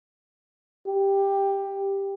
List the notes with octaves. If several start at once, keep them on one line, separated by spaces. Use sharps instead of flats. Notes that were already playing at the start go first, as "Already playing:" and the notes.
G4